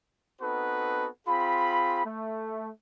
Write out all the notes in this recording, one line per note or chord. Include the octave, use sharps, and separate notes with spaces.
B3 C4 D#4 F#4 A4 B4
C4 F4 G#4 B5
A3